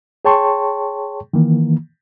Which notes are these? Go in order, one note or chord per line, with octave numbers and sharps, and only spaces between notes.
G#4 C#5 G5 A5 C6 C#6
D#3 E3 A#3